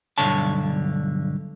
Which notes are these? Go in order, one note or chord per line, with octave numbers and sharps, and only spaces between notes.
B1 G2 D3 C#5 A5